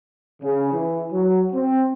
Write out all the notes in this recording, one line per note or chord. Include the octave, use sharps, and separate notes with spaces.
C#3
E3
F#3
C4